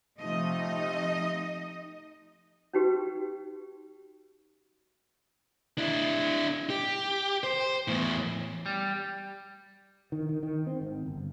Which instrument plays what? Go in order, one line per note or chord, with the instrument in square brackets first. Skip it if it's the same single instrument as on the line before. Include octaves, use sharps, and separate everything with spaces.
[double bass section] C3 F3 A3 [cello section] D#4 D#5
[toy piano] C#4 D#4 F#4 G4 B4
[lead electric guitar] D4 E4
G4
C5
E2 A2
[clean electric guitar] G3
[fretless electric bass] D#3
D#3
D#3
C4
G#1
G1